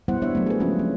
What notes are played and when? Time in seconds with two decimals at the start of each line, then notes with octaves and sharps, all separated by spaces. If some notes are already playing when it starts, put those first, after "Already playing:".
0.08 G3 B3 E4 C5 F#5
0.22 B3 D4 C#5 E5
0.35 F#3 A3
0.46 G#4 B4
0.60 F3 G#3 A#3 B3 C#4 F4
0.79 C4